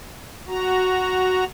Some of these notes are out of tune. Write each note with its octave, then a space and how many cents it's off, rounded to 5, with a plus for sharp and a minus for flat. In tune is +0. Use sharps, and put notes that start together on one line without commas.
F#4 +0 A#5 +0